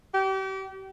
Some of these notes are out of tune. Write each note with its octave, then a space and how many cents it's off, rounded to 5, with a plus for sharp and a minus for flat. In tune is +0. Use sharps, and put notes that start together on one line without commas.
G4 -35